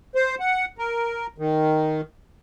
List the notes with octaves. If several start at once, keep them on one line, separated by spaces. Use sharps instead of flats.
C5
F#5
A#4
D#3